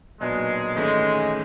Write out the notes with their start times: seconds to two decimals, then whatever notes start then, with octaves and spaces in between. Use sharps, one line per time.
0.20 B1 A#2 F#3 G#3 B3 D4
0.75 G#1 G#2 E3 G#3 A3 C#4